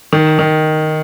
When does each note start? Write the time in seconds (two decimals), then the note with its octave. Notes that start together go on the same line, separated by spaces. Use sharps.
0.13 D#3
0.39 D#3